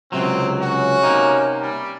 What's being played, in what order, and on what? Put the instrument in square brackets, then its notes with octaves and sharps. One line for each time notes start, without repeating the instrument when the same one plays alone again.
[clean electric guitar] C#2 C3 F#3 [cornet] C4
[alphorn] C#4 [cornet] F#4
[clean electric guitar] C3 A#3 D#4
[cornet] G3